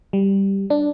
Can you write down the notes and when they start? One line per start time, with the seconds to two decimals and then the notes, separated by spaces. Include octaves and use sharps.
0.13 G3
0.70 D4